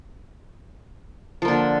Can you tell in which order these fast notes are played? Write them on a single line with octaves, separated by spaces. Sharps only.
F3 A#3 D3